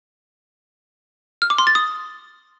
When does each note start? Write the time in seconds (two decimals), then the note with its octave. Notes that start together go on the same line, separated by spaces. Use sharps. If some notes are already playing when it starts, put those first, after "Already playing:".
1.42 F6
1.50 D6
1.58 C6
1.67 A6
1.75 D#6